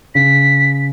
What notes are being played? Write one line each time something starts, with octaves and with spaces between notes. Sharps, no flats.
C#3 B6